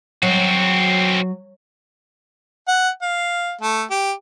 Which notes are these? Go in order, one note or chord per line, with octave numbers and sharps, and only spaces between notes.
F#3 C4 F#4
F#5
F5
A3
G4